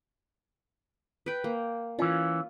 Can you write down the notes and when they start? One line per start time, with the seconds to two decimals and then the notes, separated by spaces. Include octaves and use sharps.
1.26 B4 G5
1.44 A#3
1.99 E3 C#4 F4